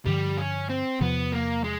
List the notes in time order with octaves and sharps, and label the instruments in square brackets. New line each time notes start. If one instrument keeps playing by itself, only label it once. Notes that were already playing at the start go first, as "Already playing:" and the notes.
[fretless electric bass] G2 D3 F3 [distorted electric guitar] G3
[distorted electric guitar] C#4
C4
[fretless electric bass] E2 C3 F3 [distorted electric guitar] B3
[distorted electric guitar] A#3
G#3